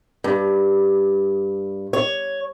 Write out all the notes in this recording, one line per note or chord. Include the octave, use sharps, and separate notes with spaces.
G2
C#5